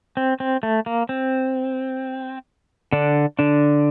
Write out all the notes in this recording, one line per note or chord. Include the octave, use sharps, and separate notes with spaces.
C4
C4
A3
A#3
C4
D3 D4
D3 D4